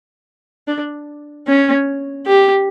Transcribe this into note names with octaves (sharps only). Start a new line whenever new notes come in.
D4
C#4
G4